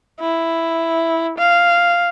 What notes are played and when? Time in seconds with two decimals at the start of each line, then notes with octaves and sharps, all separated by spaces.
0.20 E4
1.38 F5